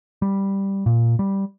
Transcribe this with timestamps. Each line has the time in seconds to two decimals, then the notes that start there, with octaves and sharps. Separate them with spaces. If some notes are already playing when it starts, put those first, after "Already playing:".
0.22 G3
0.86 A#2
1.19 G3